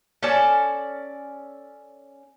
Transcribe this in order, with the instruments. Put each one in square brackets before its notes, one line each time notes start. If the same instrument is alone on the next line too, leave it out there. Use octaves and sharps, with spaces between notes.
[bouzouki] C#4 A4 D5 A5